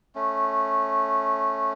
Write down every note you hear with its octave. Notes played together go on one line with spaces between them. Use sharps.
A3 C#4